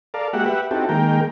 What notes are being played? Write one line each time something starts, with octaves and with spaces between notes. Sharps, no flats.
A4 A#4 D5 F5
G#3 A#3 F#4 G4 E5 F#5
G4 B4 E5 F#5
C4 D#4 E4 F#4 G4 A4
D#3 G#3 A#3 A#4 G5